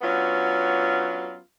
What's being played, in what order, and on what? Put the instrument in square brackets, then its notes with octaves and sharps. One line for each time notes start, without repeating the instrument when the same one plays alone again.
[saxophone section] F#3 B3 C#4 D4 F4